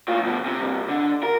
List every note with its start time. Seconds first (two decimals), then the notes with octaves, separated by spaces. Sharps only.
0.08 A2 F4
0.23 D2 B2
0.46 C3
0.60 C2 G2
0.88 D3
1.23 A#4